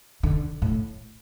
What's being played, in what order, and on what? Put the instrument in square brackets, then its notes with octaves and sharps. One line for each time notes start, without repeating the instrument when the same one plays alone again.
[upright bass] D3
A2